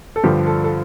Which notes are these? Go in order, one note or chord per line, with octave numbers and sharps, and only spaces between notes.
A4
G2 D3 F3 G4
A4
A4